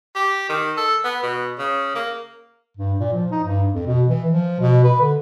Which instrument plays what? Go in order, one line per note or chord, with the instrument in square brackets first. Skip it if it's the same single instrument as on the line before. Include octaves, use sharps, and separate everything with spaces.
[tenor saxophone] G4
D#3
A4
B3
B2
C#3
A#3
[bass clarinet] G2
A#2
F3
D#4
G2
F2
B2
E3
F3
B2
B4
D3